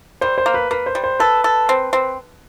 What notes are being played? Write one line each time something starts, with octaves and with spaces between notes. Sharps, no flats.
G3 C5
C5
A#3
B4
A#3 B4
C5
G3
C5
A4 B4
A4
C4
C4